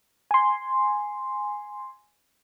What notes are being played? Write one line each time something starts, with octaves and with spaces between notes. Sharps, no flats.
G#5 C6